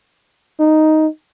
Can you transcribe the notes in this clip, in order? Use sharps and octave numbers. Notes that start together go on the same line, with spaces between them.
D#4